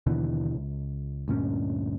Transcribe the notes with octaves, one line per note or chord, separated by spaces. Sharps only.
D#2 B2 D3 E3
C#2
D2 G2 A#2 C#4